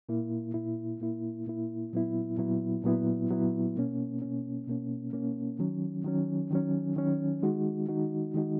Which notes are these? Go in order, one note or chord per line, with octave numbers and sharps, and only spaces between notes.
A#2 A#3 E4
A#2 A#3 E4
A#2 A#3 E4
A#2 A#3 E4
A#2 F#3 B3 E4
A#2 F#3 B3 E4
A#2 F#3 B3 E4
A#2 F#3 B3 E4
B2 A#3 C#4
B2 A#3 C#4
B2 A#3 C#4
B2 A#3 C#4
D#3 F#3 C#4
D#3 F#3 C#4
D#3 F#3 C#4
D#3 F#3 C#4
D#3 G#3 D#4 F#4
D#3 G#3 D#4 F#4
D#3 G#3 D#4 F#4